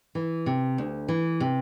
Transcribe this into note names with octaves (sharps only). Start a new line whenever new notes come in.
E3
C3
D2
E3
C3